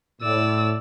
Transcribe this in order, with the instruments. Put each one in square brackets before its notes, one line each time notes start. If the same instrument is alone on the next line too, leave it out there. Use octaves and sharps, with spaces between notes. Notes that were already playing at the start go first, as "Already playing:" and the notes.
[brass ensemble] A2 [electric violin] D5 E6